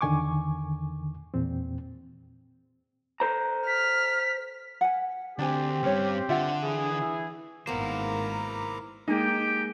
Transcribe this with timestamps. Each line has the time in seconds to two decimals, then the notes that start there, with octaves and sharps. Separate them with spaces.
0.01 E2 D3 D#3 G#5 C#6 D6
1.34 E2 A#2 C4
3.20 A4 C5 A#5
3.67 F6 B6
4.81 F#5 G#5
5.39 D2 C4 D4 G4 G#5
5.83 C#2 G2 C#4 C#5
6.29 D3 F4 E5 F#5
6.63 E3 G#4
7.02 E4
7.67 G#1 A#3 B3 E4 A#4 C5 A#5 D6
9.08 G#3 A#3 D#4 G4 G#4 G5